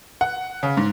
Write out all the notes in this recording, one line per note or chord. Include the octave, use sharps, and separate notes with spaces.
F#5
C#3
G#2